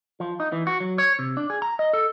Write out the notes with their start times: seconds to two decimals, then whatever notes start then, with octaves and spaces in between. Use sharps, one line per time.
0.20 F3
0.40 D#4
0.52 E3
0.67 F#4
0.80 F#3
0.98 C#5
1.19 C3
1.37 D4
1.50 G#4
1.62 A#5
1.79 D#5
1.93 A4